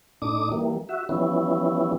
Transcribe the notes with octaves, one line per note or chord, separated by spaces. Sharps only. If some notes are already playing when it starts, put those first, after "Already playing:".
A2 D4 D#4 D6 D#6
E3 G3 A#3
F#4 E5
E3 F3 G3 B3 C#4 E4